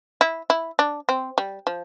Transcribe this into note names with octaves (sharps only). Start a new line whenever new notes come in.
E4
E4
D4
C4
G3
F3